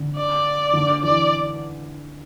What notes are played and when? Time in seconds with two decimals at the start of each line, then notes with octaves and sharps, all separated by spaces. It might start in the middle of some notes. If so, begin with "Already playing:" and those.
Already playing: D3
0.16 D5
0.73 D3
1.03 E3 D5